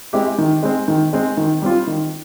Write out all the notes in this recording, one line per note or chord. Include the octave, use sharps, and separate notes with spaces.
G#3 C4 E4 G4
D#3
G#3 C4
D#3
G#3 C4
D#3
G3 C4 F4
D#3